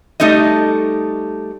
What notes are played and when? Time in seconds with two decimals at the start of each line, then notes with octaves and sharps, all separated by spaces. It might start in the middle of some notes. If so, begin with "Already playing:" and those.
0.20 G3 A3 D#4 A4 D#5